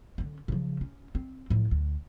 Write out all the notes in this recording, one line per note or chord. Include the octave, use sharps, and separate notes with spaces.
D3 C#4
C#3 F3
C#4
C4
A2 F3
D2